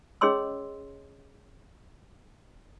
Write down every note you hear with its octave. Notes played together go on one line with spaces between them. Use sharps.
C#4 G#4 C#5 D#5 C6 E6